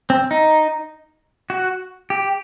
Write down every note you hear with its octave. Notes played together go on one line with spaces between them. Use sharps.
C4
D#4
F#4
G4